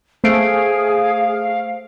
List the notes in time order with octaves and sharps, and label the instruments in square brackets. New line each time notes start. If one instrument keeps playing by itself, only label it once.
[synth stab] A3 [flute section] G#4 [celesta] C5 C7 D7 [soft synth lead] F5